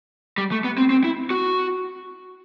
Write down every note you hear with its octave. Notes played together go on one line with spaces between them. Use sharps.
G3
A3
B3
C4
C4
E4
F#4